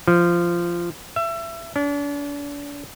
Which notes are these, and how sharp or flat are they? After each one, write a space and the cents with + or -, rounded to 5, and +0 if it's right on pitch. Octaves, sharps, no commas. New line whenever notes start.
F3 -15
E5 +25
D4 -40